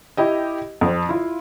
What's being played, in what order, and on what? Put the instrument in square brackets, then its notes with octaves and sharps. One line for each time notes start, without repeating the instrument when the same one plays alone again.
[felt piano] E4 G4 D#5
F2 C5
E4 F4